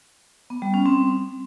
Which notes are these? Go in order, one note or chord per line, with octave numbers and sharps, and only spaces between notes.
B3
G3
C#4
C4